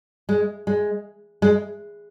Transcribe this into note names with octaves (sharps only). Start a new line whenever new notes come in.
G#3
G#3
G#3